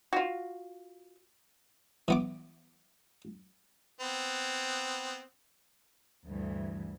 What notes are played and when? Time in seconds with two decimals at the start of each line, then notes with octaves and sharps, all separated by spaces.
0.13 F4 F#4
2.08 E3 B3 D6
4.00 B3 C4
6.27 D2 G2 E3